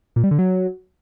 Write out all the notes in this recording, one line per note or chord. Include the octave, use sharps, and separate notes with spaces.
A#2
G3
D3
F#3